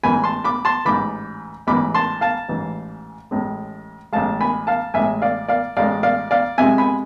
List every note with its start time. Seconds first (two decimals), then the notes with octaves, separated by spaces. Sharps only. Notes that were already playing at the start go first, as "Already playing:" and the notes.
0.03 A1 G#2 E3 G#5 B5
0.24 A5 C6
0.44 B5 D6
0.65 A5 C6
0.85 A1 G#2 E3 B5 D6
1.67 A1 G#2 E3 B5 D6
1.94 A5 C6
2.21 F5 A5
2.49 A1 G#2 E3
3.31 A1 A2 G#3
4.13 A1 A2 G#3 F5 A5
4.41 G#5 B5
4.67 F5 A5
4.94 A1 A2 G#3 E5 G#5
5.22 D5 F5
5.48 D5 F5
5.77 A1 A2 G#3 D5 F5
6.03 D5 F5
6.31 D5 F5
6.58 F2 C3 G#3 E5 G#5
6.78 G#5 B5